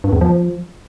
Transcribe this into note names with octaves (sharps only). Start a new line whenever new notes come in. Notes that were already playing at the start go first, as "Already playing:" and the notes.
G2
E2
F3